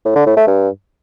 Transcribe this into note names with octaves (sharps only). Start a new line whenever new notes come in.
A2
D3
A2
A3
G2